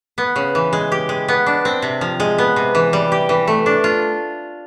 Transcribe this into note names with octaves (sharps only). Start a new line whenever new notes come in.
B3
C#3
E3
G#3
G4
G#3
B3
D4
C4
C3
F3
G#3
B3
C3
E3
G3
G4
E3
A3
D4
F4